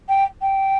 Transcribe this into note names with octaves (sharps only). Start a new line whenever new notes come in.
G5
G5